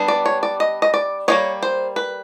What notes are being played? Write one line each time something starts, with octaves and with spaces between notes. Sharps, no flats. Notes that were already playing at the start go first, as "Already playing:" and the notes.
Already playing: G3 B3 D4
D5
C#5
D5
D#5
D#5
D5
G3 A#3 D#4 C#5
C5
B4